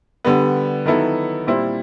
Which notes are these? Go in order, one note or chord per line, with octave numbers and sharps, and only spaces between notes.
D3 G3 B3
D#3 F#3 B3 E4 A4
A#2 G3 C4 E4